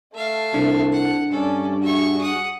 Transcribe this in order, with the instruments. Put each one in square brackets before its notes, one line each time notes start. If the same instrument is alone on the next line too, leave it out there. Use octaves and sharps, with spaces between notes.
[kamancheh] A3 A5 [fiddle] E5 F5
[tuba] C2 [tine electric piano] D4
[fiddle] F#5
[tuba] G2 [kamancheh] C#4 D5 [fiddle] A4
[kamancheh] F#4 G#4 [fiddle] E5 C#6
[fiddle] F#5 D#6